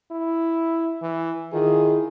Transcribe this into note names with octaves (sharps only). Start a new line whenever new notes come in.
E4
E3
D#3 E4 F4 G#4